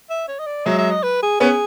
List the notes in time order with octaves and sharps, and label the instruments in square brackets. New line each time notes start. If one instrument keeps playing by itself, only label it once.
[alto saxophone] E5
C#5
D#5
D5
[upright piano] F#3 G#3 [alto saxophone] E5
[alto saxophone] E5
D#5
B4
G#4
[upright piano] B3 C#4 [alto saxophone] G#4